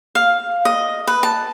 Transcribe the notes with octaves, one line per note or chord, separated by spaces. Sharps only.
F5
D#5
B4
A5